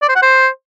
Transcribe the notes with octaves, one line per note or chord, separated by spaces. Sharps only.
D5
C5
F#5
C5